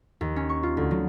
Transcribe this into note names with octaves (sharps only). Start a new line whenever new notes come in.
D#2
C#4
C#6
F4
D2
F#3